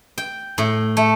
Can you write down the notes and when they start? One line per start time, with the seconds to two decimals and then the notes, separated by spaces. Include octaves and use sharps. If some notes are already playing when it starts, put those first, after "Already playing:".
0.18 G5
0.58 A2
0.97 A3